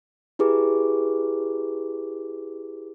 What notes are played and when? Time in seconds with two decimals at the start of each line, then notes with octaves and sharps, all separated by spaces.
0.39 E4 G4 G#4 B4 D6